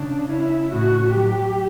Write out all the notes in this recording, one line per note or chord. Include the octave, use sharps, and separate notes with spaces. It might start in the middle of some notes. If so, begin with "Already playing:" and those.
Already playing: C#3 C#4 D4
C#4 E4
A2 F#4
F#3 G4